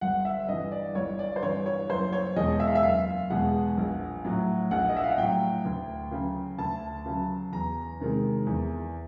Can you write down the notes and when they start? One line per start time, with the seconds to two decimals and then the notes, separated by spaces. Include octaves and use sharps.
0.01 G1 F#5
0.25 E5
0.48 G2 E3 D#5
0.72 D5
0.95 G1 C#5
1.19 D5
1.36 C5
1.43 G2 E3 C#5
1.66 C#5
1.89 F#1 C5
2.13 C#5
2.36 E2 B2 G#3 D#5
2.60 E5
2.67 F5
2.75 E5
2.83 F#1 F5
3.30 E2 B2 G#3 F#5
3.77 A#1
4.25 A2 F#3
4.71 A#1 F#5
4.89 D#5
4.96 E5
5.03 F5
5.11 F#5
5.18 A2 F#3 G5
5.65 D2
6.11 C#3 F#3
6.58 D2 A5
7.06 C#3 F#3
7.52 E2 A#5
8.00 C3 D#3 G#3
8.46 E2